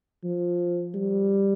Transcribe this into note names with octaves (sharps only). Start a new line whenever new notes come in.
F3
G3